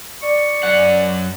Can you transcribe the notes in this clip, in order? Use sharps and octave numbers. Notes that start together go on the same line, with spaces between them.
D5 C#6
F#2 F#5